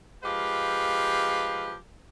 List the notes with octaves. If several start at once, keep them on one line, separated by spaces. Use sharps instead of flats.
F3 G#3 G4 B4 F5